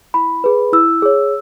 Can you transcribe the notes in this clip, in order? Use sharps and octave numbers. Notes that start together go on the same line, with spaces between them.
E4 B5
G#4 B4
E4 E6
G#4 C#5